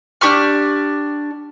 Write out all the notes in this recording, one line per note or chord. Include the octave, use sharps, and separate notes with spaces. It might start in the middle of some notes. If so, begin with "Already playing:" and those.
D4 G4 C#6 F6